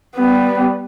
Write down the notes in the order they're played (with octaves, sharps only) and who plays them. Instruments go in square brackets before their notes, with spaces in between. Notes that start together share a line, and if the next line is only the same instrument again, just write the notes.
[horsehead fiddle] G3 B3